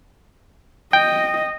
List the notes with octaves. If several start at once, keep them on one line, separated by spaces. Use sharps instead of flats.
D#5 G5